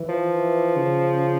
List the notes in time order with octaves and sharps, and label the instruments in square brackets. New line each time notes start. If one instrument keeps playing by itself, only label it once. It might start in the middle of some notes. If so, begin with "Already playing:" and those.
Already playing: [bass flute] E3
[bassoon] F3
[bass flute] E3
C#3